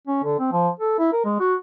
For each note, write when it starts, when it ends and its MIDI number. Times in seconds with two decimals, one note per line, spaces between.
0.07 0.19 61
0.24 0.38 50
0.39 0.50 60
0.52 0.69 53
0.80 0.98 69
0.99 1.10 64
1.13 1.24 70
1.25 1.36 56
1.40 1.55 66